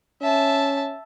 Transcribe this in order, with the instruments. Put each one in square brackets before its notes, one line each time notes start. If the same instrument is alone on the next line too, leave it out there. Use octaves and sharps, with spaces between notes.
[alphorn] C#4 [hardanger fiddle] E5 A5